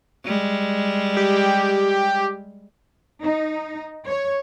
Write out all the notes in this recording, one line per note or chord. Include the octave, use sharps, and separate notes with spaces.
G3 G#3
G4
D#4
C#5